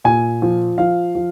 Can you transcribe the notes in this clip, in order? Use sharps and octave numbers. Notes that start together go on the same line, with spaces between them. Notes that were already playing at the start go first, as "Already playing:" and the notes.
A#2 G#5
F3
F3 F5
F3